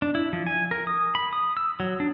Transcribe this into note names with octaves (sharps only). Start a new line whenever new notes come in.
D4
E4
F3
G#5
A#4
D#6
B5
D#6
E6
F#3
D4